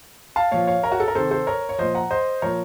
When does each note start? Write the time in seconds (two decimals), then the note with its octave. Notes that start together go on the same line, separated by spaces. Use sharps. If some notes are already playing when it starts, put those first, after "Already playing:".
0.36 F5 A5
0.51 A#2 F3 C#5 F5
0.67 C#5 F5
0.83 A#4 C#5
0.92 F#4
1.00 A4
1.08 A#4
1.15 C3 D#3 A4 C5
1.31 A4 C5
1.47 A#4 C#5
1.69 C#5
1.79 A#2 F3 C5 D#5
1.95 F#5 A#5
2.11 C5 D#5
2.42 A#2 F3 A#4 C#5